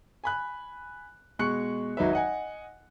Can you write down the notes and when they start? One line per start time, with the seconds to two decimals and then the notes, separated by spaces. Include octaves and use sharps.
0.24 G#5 B5 F#6
1.39 B2 G#3 C#6 F#6 C#7
1.97 G#1 F#3 D#4 B4 E5
2.13 D#5 F#5 G#5